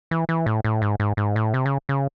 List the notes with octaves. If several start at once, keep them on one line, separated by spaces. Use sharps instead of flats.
E3
E3
A2
A2
G#2
G#2
G#2
A2
C3
C#3
C#3